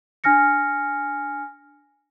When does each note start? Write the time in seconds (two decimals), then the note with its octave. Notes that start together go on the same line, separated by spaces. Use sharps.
0.24 D4 G#5 F6 A#6 C#7